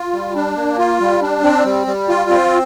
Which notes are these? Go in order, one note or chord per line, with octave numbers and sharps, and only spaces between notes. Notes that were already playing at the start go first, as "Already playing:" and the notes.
Already playing: F4
G3
D4
A#3
F4
G3
D4
C4
G3
G3
F4
C4